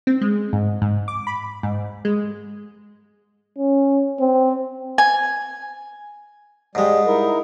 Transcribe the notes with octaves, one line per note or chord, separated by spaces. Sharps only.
C4
G#3
G#2
G#2
D6
B5
G#2
G#3
C#4
C4
G#5
G#2 G3 G#3
D#4 E4 A#4